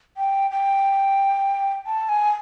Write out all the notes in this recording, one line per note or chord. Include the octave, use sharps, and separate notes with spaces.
G5
G5
A5
G#5